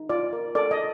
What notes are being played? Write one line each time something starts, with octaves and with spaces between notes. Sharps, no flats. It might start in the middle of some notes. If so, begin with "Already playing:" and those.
Already playing: D#4
F4 D5
A#4
A4 D5
D#5